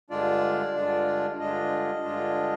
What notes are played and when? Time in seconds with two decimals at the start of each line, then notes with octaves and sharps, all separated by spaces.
0.10 G2 D3 G#3 D4 F4 D5
0.75 G2 D3 G#3 D4 F4
1.40 G2 D3 G#3 D4 F4 D#5
2.04 G2 D3 G#3 D4 F4